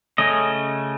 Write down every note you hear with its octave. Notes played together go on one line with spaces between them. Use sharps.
C#3 A3 C#4 D#5